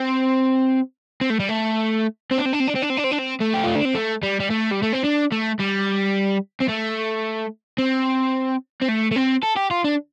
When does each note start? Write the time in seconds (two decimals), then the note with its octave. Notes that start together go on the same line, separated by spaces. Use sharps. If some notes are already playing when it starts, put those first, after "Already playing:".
Already playing: C4
1.21 C4
1.30 A3
1.40 G3
1.49 A3
2.31 C4
2.38 D4
2.45 C4
2.53 D4
2.60 C4
2.67 D4
2.75 C4
2.82 D4
2.89 C4
2.97 D4
3.04 C4
3.11 D4
3.18 C4
3.40 A3
3.54 G4
3.64 F4
3.75 D4
3.85 C4
3.95 A3
4.23 G3
4.40 G3
4.51 A3
4.72 G3
4.83 A3
4.94 C4
5.05 D4
5.32 A3
5.60 G3
6.61 C4
6.69 A3
7.78 C4
8.82 C4
8.89 A3
9.11 A3
9.16 C4
9.43 A4
9.56 G4
9.71 F4
9.84 D4